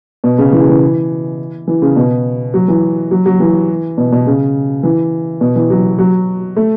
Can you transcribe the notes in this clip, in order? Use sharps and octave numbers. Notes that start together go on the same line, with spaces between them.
B2
C#3
E3
C#3
E3
E3
C#3
B2
F#3
E3
F#3
F#3
E3
B2
B2
C#3
E3
B2
E3
F#3
F#3
A3